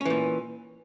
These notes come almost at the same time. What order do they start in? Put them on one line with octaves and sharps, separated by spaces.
C#4 E3 A#2